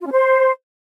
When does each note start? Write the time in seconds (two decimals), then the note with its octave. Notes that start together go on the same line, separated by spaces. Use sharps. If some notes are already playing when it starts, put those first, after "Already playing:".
0.01 F4
0.06 C#4
0.12 C5